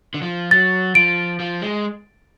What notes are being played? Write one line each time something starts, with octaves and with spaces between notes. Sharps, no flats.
D3
F3
F#3 A6
F3 D7
F3
G#3